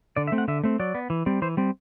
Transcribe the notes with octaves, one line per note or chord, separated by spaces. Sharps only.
D3 D5
E5
A3 C4
F#5
D3 E5
A3 C4
F#3 D5
B3
E3
G3 C4
E3 C5
G3 C4